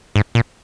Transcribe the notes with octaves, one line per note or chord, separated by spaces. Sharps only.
G#2
A#2